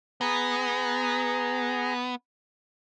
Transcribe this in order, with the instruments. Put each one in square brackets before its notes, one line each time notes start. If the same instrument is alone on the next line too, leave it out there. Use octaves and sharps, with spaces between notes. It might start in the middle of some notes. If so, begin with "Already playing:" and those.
[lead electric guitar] B3 [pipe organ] G#4 A#5